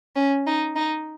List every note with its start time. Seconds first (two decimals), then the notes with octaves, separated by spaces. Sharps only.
0.16 C#4
0.46 D#4
0.76 D#4